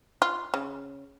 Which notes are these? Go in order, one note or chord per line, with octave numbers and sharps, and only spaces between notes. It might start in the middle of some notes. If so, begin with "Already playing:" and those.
F4
C#3